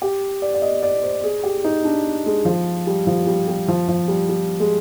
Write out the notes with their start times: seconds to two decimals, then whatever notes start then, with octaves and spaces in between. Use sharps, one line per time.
0.02 G4
0.42 D5
0.54 D5
0.62 D#5
0.83 D5
1.03 C5
1.24 G#4
1.43 G4
1.64 D#4
1.85 D4
2.26 G#3
2.45 F3
2.87 G3
3.07 F3
3.27 G3
3.48 G3
3.68 F3
3.89 F3
4.08 G3
4.29 G3
4.60 G#3